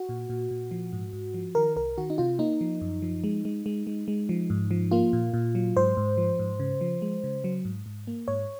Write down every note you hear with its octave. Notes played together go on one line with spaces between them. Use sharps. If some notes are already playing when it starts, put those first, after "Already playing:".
Already playing: F#4
A#2
A#2
A#2
F3
G#2
G#2
F3
D#3 A#4
C2 A#4
D#3 F#4
D#4
C3 F4
A#3 D#4
F3
F#2
F3
G#3
G#3
G#3
G#3
G#3
F3
G#2
F3
A#3 F4
A#2
A#2
F#3
G#2 C5
G#2
F3
G#2
C#3
F3
G#3
C#3
F#3
G#2
G#2
A#3
G#2 C#5